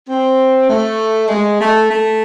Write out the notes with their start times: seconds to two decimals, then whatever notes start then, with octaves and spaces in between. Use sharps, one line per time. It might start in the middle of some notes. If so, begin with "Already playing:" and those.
0.08 C4
0.68 A3
1.29 G#3
1.59 A3
1.89 A3